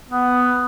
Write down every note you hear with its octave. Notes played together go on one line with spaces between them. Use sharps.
B3